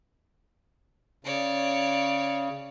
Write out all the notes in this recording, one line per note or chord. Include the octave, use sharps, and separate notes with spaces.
C#3 C#5 D5